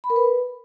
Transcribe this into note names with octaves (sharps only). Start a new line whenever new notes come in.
B5
A#4
B4